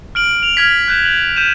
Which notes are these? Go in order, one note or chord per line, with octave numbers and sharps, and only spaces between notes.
F6 D7 F#7
F7
F6 G#6 B6
F#6 G6 E7
F#7
G6 D#7 E7